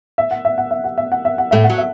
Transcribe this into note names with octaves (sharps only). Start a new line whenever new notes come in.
E5
F#5
E5
F#5
E5
F#5
E5
F#5
E5
F#5
A2 A3 E5
F#5
F#3
E5